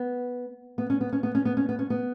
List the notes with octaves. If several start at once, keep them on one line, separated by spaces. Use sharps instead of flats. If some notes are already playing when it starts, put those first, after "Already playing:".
Already playing: B3
B3
C#4
B3
C#4
B3
C#4
B3
C#4
B3
C#4
B3